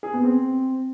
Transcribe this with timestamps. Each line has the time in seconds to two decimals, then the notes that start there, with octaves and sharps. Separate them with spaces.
0.03 G#4
0.13 B3
0.24 C4